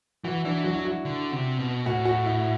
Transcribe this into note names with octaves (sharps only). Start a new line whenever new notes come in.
E3 F#4
E3 D4
F#3 F#4
E4
F#4
D3
C3
B2
A2 F#4
F#4
E4